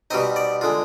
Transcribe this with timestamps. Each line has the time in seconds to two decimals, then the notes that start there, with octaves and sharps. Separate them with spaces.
0.11 B2 G3 C4 D#4 D#5
0.36 D5
0.61 D3 G#3 F4